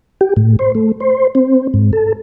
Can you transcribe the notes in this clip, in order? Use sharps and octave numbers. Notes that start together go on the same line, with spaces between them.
G4
A2
C5
A3
C5
C4
G#2
A4